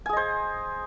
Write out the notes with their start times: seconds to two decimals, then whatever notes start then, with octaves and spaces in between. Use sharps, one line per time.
0.06 G#5
0.09 G#4
0.13 D#5
0.17 C5